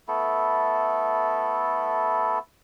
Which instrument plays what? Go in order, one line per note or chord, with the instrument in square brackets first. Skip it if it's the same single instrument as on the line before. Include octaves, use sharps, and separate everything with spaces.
[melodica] A3 B3 E4 A4